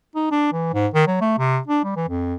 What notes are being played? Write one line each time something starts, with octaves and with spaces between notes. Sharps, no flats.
D#4
D4
E3
G#2
D#3
F#3
A3
C3
D4
G3
E3
F2